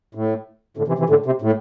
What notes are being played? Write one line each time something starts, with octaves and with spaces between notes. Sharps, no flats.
A2
A2 D3
C3 E3
C3 E3
A2 D3
C3
A2